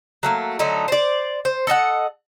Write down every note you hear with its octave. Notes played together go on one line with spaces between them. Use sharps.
F#3 A3 A#3
D3 F#3 A3 D#4
C5 D5
C5
A4 D#5 E5 F#5